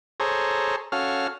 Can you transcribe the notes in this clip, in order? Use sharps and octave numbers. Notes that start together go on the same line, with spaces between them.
G#4 A4 C5 C#5 A#5
C#4 F#4 A4 F5 F6